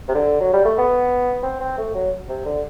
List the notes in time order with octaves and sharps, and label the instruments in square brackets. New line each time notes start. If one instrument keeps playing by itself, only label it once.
[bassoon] C3
D3
F#3
G3
A3
B3
C4
C4
A3
F#3
C3
D3